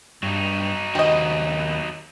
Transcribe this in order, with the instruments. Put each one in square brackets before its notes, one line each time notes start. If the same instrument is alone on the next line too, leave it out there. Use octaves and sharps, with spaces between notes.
[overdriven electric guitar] G2 [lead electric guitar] F#3 D#4
[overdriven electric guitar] D#2 F#4 [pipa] G3 D#5